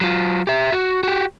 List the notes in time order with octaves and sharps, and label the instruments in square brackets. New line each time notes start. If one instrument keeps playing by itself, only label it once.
[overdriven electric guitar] F#3 F4
G4 E5
F#4
F#4 G4